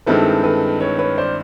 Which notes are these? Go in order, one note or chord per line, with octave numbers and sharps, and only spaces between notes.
G2 D#3 G#3 C4 E4 A4 B4
A4 B4
B4 C#5
B4 C#5
C5 D5